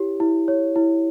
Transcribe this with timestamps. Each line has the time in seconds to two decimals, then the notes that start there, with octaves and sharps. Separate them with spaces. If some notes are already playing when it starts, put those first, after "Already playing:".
Already playing: E4 G4 C#5
0.20 E4
0.48 C#5
0.76 E4